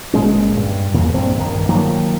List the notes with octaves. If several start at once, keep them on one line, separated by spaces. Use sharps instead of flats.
G1 A#2 G#3 C#4
G2
E2 A#2
A#1 G2 C4
A#1 G2 D#3
D#3 F3 F#3 A#3